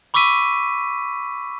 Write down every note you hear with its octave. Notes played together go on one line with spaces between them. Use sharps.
B5 C#6 D6 E6 B6 D#7